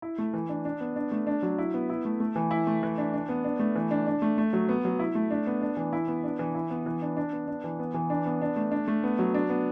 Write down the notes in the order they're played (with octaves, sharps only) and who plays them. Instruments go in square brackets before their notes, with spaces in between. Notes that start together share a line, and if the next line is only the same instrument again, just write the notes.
[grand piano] E4
A3
E3
D4
D4
B3
D4
A3
D4
F#3
E4
B3
E4
A3
A3
E3
E4
A3
E3
D4
D4
B3
D4
A3
E3
D4
D4
A3
A3
F#3
B3
F#3
E4
A3
D4
B3
D4
E3
E4
B3
D4
E3
E4
B3
E3
D4
D4
B3
D4
E3
B3
E3
D4
B3
D4
A3
D4
A3
B3
F#3
D4
B3